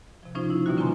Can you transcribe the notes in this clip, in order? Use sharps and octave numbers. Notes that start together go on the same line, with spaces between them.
C3 F3
C#3 F3 C#4 D#4 F4 C5
E4
B2 D3 E3 G3 A#3 F#4
D3 C#4 F4 G#5 A#5 C6